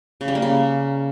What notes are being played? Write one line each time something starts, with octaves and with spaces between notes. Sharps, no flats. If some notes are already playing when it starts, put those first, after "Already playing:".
C#3
G3
A#3
C#3